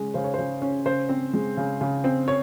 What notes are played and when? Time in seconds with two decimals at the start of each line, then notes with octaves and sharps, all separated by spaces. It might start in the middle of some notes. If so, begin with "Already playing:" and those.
Already playing: C#3 G#3 C#4
0.14 C#3 C5
0.24 C#5
0.34 C#3 C5
0.62 C#4
0.85 C#3 C5
1.09 C4
1.34 G#3
1.57 C#3
1.81 C#3
2.04 C4
2.28 C#5